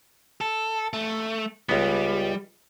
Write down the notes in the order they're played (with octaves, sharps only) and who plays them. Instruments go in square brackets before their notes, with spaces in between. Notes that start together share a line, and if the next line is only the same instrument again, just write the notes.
[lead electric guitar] A4
A3
[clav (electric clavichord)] C#2 B3 [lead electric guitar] G3